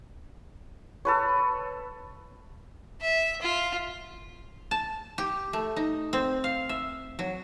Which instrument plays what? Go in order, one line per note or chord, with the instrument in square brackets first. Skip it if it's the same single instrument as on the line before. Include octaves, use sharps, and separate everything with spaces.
[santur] A4 B4 C#5
[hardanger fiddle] E5
F4
[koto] A5
G4
A3
D#4
C4
F5
E5
F#3